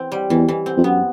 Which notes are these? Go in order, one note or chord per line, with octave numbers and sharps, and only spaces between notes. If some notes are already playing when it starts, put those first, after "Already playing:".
Already playing: E3 C4
G3
E2 E3
E3
C4
F2
F#2 B3